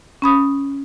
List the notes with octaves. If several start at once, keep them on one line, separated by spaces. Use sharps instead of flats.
C#4 B5 D#6